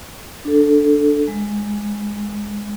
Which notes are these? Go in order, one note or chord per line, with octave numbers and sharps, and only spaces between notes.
D4 A4
G#3